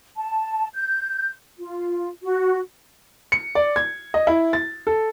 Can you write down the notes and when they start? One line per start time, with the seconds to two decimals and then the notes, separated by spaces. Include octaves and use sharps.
0.17 A5
0.75 G6
1.58 F4
2.23 F#4
3.32 C#7
3.55 D5
3.76 G#6
4.14 D#5
4.27 E4
4.53 A6
4.87 A4